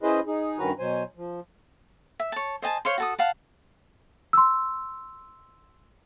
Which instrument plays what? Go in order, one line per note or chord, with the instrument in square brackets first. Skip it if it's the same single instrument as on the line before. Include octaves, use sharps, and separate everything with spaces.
[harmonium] C#4 E4 G#4 B4 C5 D#5
D#4 G#4
G2 D#3 C#4 F#4 B4 A#5
B2 F#3 C5 G#5
F3
[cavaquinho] E5
C#5 A5
C5 D#5 G#5 A5
C5 C#5 F5 C6
F#4 A4 D#6
F5 F#5 A5
[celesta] C6 E6